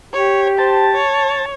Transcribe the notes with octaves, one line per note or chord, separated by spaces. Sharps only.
G4 C#5
C5 A5
C#5